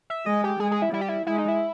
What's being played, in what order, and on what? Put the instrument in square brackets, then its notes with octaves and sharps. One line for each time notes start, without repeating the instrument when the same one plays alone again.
[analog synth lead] E5
[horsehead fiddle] G#3 [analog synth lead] D#5
[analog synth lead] G4
[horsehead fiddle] G#3 [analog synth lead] G#4
[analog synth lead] G#4
E4
[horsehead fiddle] G3 [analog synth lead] E4
[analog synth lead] G4
E4
[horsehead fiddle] G#3 [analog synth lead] E4
[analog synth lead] D#4
E4